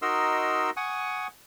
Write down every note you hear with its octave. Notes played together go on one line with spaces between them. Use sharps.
D#4 F#4 A#4 D#5 C6 E6
F#5 G#5 C#6 D#6